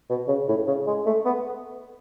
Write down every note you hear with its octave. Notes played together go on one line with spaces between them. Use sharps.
B2
C#3
A2
C#3
G#3
A3
B3